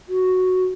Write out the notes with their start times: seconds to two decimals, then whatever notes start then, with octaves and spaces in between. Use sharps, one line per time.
0.09 F#4